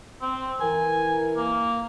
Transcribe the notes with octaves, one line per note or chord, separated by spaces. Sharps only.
C4
E3 A#4 G#5
A#3